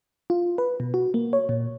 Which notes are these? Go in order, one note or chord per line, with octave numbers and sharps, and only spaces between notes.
F4
B4
B2
F#4
A#3
C#5
A#2